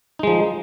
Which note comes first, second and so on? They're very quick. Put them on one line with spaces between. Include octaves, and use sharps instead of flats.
D#4 G#3 F3